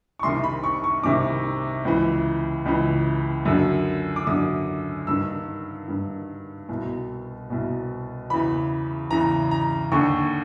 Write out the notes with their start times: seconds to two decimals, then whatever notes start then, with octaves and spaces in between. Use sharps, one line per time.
0.19 C#6
0.23 C2 C3 D#3 C6
0.44 B5
0.64 C#6
0.84 C#6
1.03 C2 C3 D#3 D6
1.85 C#2 C#3 E3
2.66 C#2 C#3 E3
3.45 F#2 D3
4.16 D6
4.27 F#2 D3 D#6
5.07 G2 D#3 E6
5.88 G2 D#3
6.69 C2 B2
7.50 C2 B2
8.30 E2 C#3 E3 B5
9.11 E2 C#3 E3 A#5
9.51 A#5
9.92 D#2 D3 C#6